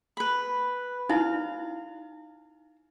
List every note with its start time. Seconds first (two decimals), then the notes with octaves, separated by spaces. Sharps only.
0.17 B4 B5
1.09 D#4 E4 F5